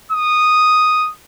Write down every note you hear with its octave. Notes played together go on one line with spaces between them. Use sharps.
D#6